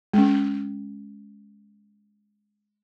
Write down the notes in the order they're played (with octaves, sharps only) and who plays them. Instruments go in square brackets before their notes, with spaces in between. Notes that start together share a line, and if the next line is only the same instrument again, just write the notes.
[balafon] G#3 C#4